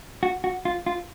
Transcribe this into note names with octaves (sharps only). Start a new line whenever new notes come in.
F#4
F#4
F4
F4